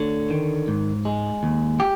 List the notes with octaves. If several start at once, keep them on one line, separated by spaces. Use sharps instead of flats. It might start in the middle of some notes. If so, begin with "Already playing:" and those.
Already playing: D2 D3 C#5
D#3
G#2
G#3
D#2
G4